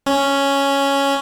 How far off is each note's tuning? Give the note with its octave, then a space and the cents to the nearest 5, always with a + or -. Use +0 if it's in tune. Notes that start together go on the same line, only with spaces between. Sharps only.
C#4 +0